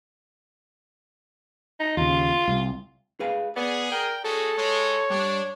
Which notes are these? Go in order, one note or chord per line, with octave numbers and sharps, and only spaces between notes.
D#4
D#2 C#3 F4
C2
G#4 B4 F5
B3 G#4 D5
A#4 G5
G#3 C#4 F#4 G#4 A4
G#3 C#5
G2 D4